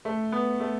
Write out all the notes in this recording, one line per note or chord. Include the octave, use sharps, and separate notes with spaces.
A3
B3
A3